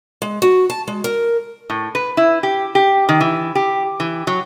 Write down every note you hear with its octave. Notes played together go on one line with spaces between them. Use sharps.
G#3
F#4
A5
G#3
A#4
A2
B4
E4
G4
G4
D#3
E3
G4
E3
F#3